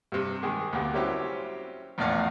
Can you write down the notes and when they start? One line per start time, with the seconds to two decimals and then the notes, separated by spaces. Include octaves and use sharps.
0.12 G2 C3
0.43 D#3 G#3 G4 G#4
0.73 D2 A#3 B3 G4
0.94 F#3 G3 C4 C#4 E4 G4
1.98 A#1 E2 A2 D5 F5 F#5